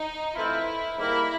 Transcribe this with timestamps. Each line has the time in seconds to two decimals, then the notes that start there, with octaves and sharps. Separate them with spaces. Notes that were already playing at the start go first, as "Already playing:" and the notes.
Already playing: D#4
0.35 E3 A3 C4 E4 F4
0.98 G#2 D#3 G3 A#3 E4